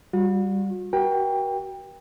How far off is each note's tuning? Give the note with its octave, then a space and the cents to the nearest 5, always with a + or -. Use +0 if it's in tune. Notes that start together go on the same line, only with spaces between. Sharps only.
G3 +0 F#4 -40
F#4 +35 A#4 +35 G5 +20